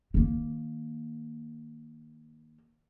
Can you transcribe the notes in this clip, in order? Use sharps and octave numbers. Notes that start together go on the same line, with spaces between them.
D#3 A#3